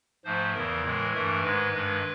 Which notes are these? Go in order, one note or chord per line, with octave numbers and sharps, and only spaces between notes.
G#2 F3 A3 C5
E2 C#3 E3 A#4
A2 E3 G#3
G2 E3 A3 A#4
G#2 D#3 G#3 B4
G2 D#3 G#3